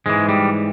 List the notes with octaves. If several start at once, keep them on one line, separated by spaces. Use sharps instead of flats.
G#2 E3 G#3
G3